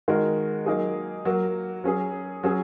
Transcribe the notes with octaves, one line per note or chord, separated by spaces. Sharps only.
D#3 G#3 D#4 F#4 A#4
F#3 A#3 D#4 G#4
F#3 A#3 F#4 A#4
F#3 C#4 G#4
F#3 C#4 G#4